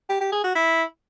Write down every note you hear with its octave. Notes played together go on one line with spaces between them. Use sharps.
G4
G4
G#4
F#4
E4